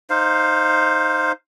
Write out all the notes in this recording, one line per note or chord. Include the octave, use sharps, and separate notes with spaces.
D#4 C5 F5